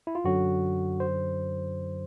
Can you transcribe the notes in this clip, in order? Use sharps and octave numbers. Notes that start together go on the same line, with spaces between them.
E4
F4
F#2 D3 F#3 F#4
C5